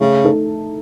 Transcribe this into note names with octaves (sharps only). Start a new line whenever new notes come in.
C#3 A3
D#4 A4